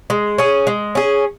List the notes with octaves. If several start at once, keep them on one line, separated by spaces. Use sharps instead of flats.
G#3
C#4 G#4
G#3
C#4 G#4